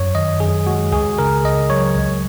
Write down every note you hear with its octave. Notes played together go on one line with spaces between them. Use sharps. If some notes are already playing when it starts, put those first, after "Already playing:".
Already playing: F#2 C#5
D#3 D#5
F#2 G#4
G#3 F#4
C#2 G#4
C#3 A#4
C#2 D#5
F#3 C#5
C#2